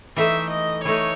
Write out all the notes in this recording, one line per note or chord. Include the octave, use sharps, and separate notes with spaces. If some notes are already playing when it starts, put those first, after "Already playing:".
E3 A3 D#4 E5
D#5
E3 A3 D#4 C#5